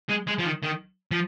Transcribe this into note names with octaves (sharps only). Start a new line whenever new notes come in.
G#3
G#3
F3
D#3
D#3
F3